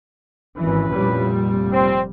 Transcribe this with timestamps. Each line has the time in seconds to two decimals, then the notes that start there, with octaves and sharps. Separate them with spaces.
0.58 G#1 E3 C#4 E4 B4
0.92 F1 A#2 G3
1.72 C4